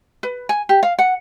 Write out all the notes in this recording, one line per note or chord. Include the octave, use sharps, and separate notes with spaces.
B4
G#5
G4
F5
F#5